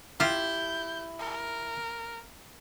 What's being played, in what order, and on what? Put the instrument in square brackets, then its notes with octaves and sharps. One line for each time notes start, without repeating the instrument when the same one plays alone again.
[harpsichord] E4 [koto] F4 G4 [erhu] G6
[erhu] A#4